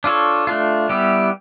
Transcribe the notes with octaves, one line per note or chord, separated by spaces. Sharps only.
D4 F4 A4 C#5
A3 D4 F4
G3 B3 E4 G4